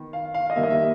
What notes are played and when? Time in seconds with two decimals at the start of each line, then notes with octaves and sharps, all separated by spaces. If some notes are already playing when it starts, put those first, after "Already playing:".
Already playing: D#3 B3
0.13 F5
0.34 F5
0.50 D#5
0.56 D#3 G3 A#3 E5
0.63 D#5
0.70 E5